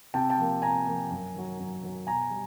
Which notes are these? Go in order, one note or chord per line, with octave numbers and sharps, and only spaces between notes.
C3 G5 A5
G5 A5
F3 A#3
C3 G#5 A#5
F3 A#3
F#2
D#3 F#3
F#2
D#3 F#3
B2 G#5 A#5
G3